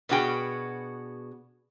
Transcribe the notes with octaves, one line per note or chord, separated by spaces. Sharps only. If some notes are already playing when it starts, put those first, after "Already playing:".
B2 B3 D4 F#4 G#4 G5